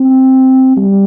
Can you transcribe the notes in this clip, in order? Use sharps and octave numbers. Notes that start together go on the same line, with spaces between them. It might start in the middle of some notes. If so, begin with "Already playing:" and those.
Already playing: C4
G3